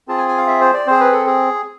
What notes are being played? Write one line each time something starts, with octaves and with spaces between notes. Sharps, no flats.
C4 F4 G#4 A5
G#5
G#5
F5
E5
C5
D5
C4 G#4 C5
B4
A4
G#4